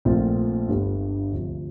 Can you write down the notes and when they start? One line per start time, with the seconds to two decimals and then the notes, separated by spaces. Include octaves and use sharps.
0.05 A#1 A#2 A3 C4 F4
0.68 G1 G2 D3 G3
1.32 D2 C3 F3